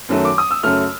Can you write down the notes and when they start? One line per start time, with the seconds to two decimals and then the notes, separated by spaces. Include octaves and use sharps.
0.09 F#2 D#3 F#3 A3
0.25 D6
0.38 D#6
0.51 E6
0.63 F#2 C#3 F#3 A3 F6